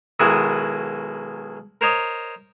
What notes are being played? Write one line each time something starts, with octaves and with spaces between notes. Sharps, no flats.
B1 D#3 G#3 E4 F#4 G#5
A#4 C5 C#5 D#5